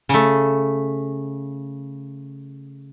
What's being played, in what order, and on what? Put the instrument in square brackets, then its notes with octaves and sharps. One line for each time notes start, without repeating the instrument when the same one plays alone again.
[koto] C#3 A3